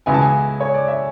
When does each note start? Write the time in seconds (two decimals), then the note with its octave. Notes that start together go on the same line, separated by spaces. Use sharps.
0.06 C#2 C#3 G#3 B3 E4 G#5
0.14 A5
0.22 G#5
0.60 C#5
0.74 D5
0.88 E5